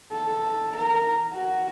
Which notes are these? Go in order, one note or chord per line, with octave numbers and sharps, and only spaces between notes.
A4
A#4
F#4